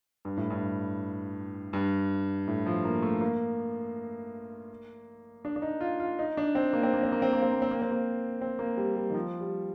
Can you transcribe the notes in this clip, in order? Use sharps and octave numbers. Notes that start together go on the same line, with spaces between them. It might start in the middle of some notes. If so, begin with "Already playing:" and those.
G2
A2
G2
G2
A2
F3
A#3
A3
A#3
D4
D4
D#4
F4
F4
D#4
D4
C4
A#3
C4
A#3
C4
A#3
C4
A#3
C4
A#3
C4
A#3
C4
A#3
C4
A#3
G3
G3
D#3
F3
G3